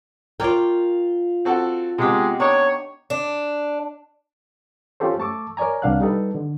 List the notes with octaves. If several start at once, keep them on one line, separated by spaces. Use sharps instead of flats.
F4 A#4 C#5 D5 G5
C4 F#4 A4
C3 G#3 B3 G4
D4 D#4 C#5
D4
C#4 F4 G4 A4 C5
A3 A5 C#6 D6 E6
A#4 C#5 D5 G#5 A#5
C2 D4 F5 F#5 F#6
G3 D#4 A4 B4
D3